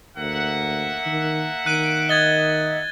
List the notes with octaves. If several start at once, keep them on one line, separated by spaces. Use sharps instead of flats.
D2 A#3 E5 F#5
D#3
D#3 F#6 D7 D#7
D#5 G#6 A6 G7